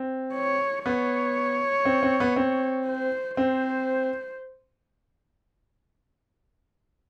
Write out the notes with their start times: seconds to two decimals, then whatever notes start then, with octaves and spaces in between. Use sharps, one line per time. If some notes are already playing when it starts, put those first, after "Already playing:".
Already playing: C4
0.34 C#5
0.86 B3 C#5
1.85 C4
2.03 C4
2.20 B3
2.36 C4
2.86 C5
3.37 C4 C5